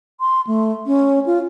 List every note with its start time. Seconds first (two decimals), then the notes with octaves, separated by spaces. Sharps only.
0.20 C6
0.47 A3
0.86 C#4
1.26 F4